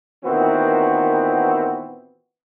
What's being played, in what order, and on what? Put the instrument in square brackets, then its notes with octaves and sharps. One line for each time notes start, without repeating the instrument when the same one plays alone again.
[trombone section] A#2 D#3 E3 B3 C4 F#4